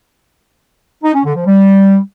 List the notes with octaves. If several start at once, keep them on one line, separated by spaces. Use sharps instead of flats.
D#4
C#4
D3
F3
G3